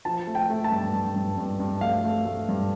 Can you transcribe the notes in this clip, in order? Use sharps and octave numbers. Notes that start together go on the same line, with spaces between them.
F3 A5
A3
G5
A3
A5
G2
G2
G2
G2
G2
A3 F5
A3
A3
G2